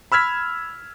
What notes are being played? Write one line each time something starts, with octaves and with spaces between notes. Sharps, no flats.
B5 E6 F6 G#6 B6